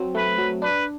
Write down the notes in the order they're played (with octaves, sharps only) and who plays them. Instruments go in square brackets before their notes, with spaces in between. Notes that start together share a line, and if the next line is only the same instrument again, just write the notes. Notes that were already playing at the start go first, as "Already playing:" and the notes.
Already playing: [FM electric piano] F#3 C4
[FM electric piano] A3 [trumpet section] B4
[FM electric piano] F#3
[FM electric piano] D4 [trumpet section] B4